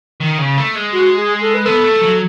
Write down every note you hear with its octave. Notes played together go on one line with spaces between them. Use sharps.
D#3
C#3
A3
G#3
F#4
G#4
A4
B4
B3 A4
A3
F#3